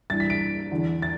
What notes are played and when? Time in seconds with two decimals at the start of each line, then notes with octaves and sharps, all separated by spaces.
0.10 G2 E3 A6
0.20 B6
0.30 D7
0.71 E2 D3
1.02 A6